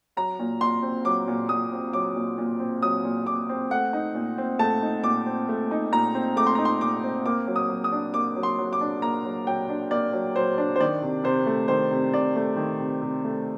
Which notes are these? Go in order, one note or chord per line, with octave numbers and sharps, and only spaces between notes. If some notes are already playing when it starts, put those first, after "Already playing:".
F#3 A#5
A#2
A#2 C6
C4
F#3 D6
A#2
A#2 D#6
C4
F#3 D6
A#2
A#2
C4
F#3 D#6
A#2
A#2 D6
C4
A3 F#5
D#4
A#2
C4
A3 A5
D#4
A#2 D6
C4
A3
D#4
A#2 A#5
C4
A3 D6
C6
D#4 A#5
C6
A#2 D6
C4
A#3 D6
F#3
D#6
F#3
D#6
D4
A#3 D6
F#3
C6
F#3
D6
D4
A#3 A#5
F#3
F#3 G5
D4
A#3 D5
F#3
F#3 C5
D4
C5
D#3 D5
C3
C3 C5
A3
D#3 C5
C3
C3 D5
A3
D#3
C3
C3
A3